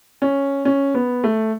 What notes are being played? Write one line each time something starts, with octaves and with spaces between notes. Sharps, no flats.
C#4
C#4
B3
A3